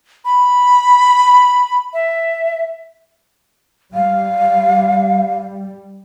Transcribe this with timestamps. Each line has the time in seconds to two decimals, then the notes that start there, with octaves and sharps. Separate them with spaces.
0.25 B5
1.93 E5
3.94 G3 F5